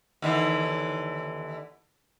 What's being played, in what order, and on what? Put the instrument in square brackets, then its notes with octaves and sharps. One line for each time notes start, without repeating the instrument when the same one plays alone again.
[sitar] D#2 D3 E3